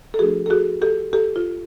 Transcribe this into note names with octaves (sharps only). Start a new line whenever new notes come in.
A4
F3 A3 D4 F#4 G#4
A4
F#4 G#4
G4 A4
G4 A4
F4